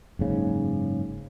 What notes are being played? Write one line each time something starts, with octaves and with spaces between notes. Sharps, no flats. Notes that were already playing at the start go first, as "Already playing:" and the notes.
F#1 G#2 C#3